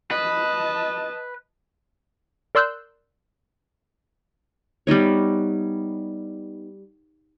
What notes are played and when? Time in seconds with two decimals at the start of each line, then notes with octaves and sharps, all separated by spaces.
0.11 B4 D#5 A5
2.55 A#4 D5 C6 E6 F#6 G6
4.87 G3 B3 D#4 C#5